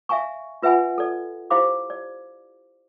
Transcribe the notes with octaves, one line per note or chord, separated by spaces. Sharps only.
E5 F5 G#5 A#5 C#6
F4 B4 E5 F#5 G#5 B5
A4 D5
E4 G4 C5 F5 B5 D6
D5